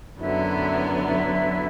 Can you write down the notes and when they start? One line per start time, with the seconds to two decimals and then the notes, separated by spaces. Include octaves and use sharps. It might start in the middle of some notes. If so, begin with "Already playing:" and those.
0.19 F#2 D3 F#3 B3 E4 E5
1.06 E4 E5